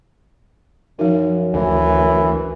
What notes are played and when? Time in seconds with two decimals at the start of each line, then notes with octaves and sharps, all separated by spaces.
0.99 F#2 F3 D#4
1.54 D2 E3